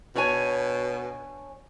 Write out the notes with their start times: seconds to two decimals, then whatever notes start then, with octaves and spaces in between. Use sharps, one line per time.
0.16 B2 D4 C#5 G#5